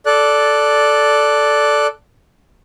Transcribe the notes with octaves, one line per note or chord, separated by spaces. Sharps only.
A4 D5 F#6